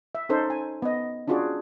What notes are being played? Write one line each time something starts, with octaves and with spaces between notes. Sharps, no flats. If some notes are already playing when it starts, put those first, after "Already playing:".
E5
C#4 D#4 A4 C5
G#5
B3 D#5
C#4 D4 F4 F#4 G#4 D5